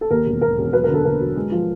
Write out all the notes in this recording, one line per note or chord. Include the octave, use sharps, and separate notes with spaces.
A4
D#2 A#4
E1
E1 A#4
E1
F#3 B4
D3 A#4
A4
D3 A#4
F#3
G#3
F3